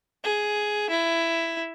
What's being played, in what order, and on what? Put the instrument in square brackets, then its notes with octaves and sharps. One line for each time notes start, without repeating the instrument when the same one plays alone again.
[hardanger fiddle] G#4
E4